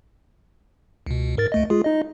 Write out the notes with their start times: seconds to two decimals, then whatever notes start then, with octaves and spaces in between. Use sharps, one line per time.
1.06 C#2 B2
1.37 G#2 A#4 A6
1.52 D2 A3 D#5
1.70 G#3 F4 G#4
1.84 D#4 D#5